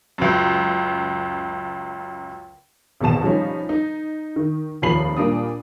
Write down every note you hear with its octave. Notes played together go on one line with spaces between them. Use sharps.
C#2 F#2
G#1 E2 B2 A5 E7
F3 G3 C#4 D#4
D#4
D#3
F1 D#2 F3 B5 C7 F#7
A#2 G3 A#3 D4 D#6